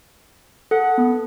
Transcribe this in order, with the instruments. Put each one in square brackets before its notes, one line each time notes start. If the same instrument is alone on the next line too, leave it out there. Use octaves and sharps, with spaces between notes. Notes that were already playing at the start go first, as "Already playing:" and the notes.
[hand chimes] A4 [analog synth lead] F#5
[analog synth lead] B3